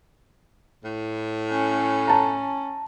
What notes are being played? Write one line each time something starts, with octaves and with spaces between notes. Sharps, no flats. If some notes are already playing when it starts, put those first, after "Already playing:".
A2
C#4
A5 A#5